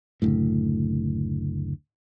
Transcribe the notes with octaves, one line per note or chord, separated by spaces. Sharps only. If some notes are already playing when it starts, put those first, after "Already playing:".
F#1 D2 A2